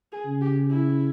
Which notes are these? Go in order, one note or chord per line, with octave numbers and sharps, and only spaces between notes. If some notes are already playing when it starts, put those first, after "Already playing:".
G#4
C#3
G4
E4